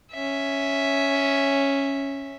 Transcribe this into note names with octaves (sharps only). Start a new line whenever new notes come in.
C#4 E5